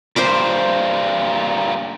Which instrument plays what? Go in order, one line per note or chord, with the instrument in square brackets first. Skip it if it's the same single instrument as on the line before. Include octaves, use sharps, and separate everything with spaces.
[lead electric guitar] G2 A#2 [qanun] C5 E5 D6